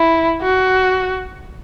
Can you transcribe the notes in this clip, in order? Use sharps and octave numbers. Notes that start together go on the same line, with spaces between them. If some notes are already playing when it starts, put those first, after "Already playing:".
Already playing: E4
F#4